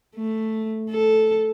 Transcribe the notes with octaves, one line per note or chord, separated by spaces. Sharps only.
A3
A4